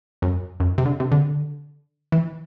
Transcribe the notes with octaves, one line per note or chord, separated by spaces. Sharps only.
F#2
F#2
C3
D3
C3
D3
E3